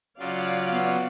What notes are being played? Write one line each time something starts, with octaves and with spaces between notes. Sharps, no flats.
C#3 F#3 F4 D5 F5
B3